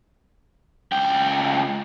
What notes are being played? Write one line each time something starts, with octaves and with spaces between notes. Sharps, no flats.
C#2 G5